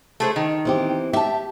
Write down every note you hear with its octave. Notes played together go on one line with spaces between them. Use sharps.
A3 G#4 C5
D#3
E3 C4 G4
G4 E5 A5